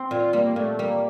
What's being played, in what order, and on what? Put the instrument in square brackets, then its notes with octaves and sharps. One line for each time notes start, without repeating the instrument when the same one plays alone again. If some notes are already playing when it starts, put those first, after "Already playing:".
Already playing: [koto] C4
[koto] A#2 [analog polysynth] F4
[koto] G3 [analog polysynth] A#3
[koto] A#2 [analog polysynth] A3
[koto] G3 [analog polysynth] A#3